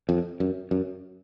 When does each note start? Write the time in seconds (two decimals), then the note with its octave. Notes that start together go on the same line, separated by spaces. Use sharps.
0.09 F2
0.40 F#2
0.71 F#2